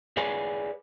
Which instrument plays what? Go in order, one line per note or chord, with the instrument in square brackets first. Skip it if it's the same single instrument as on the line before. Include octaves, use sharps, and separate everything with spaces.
[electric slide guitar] G#4 B4 C#5 D5 F5 G#5